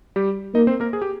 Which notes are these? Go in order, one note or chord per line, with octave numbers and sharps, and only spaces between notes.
G3 G4
A#3 D#4 D#5
C4 C5
A#3 A#4
G#4
G4